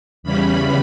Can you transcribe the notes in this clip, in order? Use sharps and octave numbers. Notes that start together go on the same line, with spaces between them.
E2 C#3 E3 G3 C#4 B5